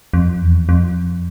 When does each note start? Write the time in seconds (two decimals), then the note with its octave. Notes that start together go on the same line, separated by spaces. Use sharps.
0.14 F2
0.41 E2
0.69 F2